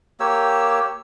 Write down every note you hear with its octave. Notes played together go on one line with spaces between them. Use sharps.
A#3 G4 C#5 E6